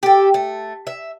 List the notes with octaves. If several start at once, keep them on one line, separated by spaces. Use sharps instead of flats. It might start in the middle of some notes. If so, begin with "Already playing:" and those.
G4 A4
A3
E5